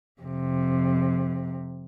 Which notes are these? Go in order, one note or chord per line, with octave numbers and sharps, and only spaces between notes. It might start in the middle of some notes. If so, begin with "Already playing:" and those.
F2 C3